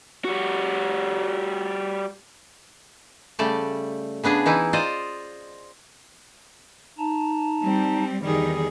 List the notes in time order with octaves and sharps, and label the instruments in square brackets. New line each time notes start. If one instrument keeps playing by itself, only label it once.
[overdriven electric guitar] G3 F#4
[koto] C#3 G3 A3 D5 A5
C#3 B3 D4 G#4
E3 D#4 E4
F4 C5 D5 D#5
[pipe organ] D#4 A5 A#5
[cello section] G3 [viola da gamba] C4
[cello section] E2 D#3 D#4 [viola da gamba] G3 G#4